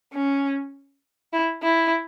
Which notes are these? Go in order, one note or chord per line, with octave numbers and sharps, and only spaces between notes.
C#4
E4
E4